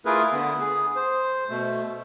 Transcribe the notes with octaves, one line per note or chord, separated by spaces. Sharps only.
A3 E4 F4 G#4 A#4 B4
D3 B3
G#4
C5
B2 A3